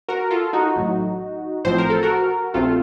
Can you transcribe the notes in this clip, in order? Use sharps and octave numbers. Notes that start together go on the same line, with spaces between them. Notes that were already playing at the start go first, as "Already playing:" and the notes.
F#4 A#4
F4 A4
D#4 F#4
A1 A2 F#3
A1 A2 F3 C4 C5
A#4
A4
F#4 A#4
A#1 A#2 A3 C4 F4 A4